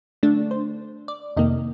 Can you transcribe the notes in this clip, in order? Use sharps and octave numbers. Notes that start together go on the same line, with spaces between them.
D3 A3 D4
C5
D5
F2 C3 D#3 A#3 D#5